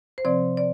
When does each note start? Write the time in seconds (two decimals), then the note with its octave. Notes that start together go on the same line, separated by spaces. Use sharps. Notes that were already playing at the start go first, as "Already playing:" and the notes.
0.18 C5
0.25 C3 F3 C4 D5
0.57 D5